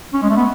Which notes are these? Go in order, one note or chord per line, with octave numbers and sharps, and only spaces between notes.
C#4
G#3
A3
B3